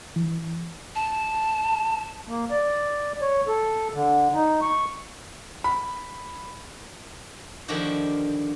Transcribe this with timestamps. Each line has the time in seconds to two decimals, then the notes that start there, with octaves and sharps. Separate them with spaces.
0.16 E3
0.95 A5
2.29 A#3
2.51 D5
3.21 C#5
3.48 A4
3.94 D3
4.34 D#4
4.61 C#6
5.64 B5
7.68 D3 D#3 F3 E4 F#4 G4